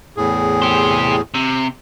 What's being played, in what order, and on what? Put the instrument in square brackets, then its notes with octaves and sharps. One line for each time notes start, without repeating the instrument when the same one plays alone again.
[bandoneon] E2 A2 G#4
[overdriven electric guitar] G4 C5
C3